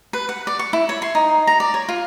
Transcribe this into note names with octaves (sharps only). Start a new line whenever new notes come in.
B4
F#5
D5
C#6
E4
C#5
C6
D#4
A#5
D5
C#5
F4